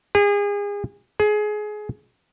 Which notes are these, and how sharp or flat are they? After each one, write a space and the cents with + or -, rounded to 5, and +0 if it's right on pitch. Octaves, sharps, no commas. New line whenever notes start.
G#4 -35
G#4 +20